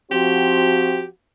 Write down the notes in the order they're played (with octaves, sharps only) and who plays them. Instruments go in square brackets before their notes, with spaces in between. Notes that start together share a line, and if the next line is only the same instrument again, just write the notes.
[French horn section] F3 C4 F#4 [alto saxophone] G4